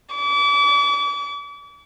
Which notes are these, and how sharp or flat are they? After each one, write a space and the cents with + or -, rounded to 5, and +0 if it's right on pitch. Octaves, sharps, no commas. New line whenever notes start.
D6 -40